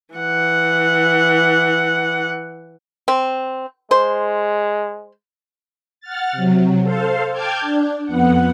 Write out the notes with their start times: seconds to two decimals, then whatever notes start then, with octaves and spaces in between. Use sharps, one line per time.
0.14 E3 F#5
3.08 C4
3.91 G#3 C5
6.00 F#5 F6 A6
6.32 C3 F#3
6.83 A4 C5 F5
7.32 G5 A5 D6 F6 G6 G#6
7.60 D4
8.05 F2 B3 F#5